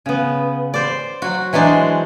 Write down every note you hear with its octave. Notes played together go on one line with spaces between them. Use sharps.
C#3 B3
C5 D5
F#3 F#4
E3 F#3 G#3 D4 C5